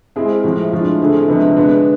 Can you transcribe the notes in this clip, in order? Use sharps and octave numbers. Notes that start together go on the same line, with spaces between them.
G#3 C4 E4 G#4
A2 F3 G#3 C4
A2 F3 G#3 D4 F4
D3 A3 C4 E4 G#4
C3 F3 G#3 B3 D4
D3 G#3 B3 D4